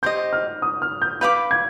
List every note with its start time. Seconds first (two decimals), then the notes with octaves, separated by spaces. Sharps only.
0.03 G4 C5 D#5 G6
0.33 F6
0.62 D#6
0.82 F6
1.02 G6
1.21 B4 F5 B5 D6 G6
1.51 G#6